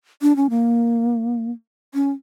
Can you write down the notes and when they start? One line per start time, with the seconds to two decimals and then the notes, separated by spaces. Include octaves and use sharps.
0.22 D4
0.36 C#4
0.50 A#3
1.94 C#4